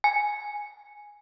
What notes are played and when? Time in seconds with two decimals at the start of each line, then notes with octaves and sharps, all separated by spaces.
0.04 G#5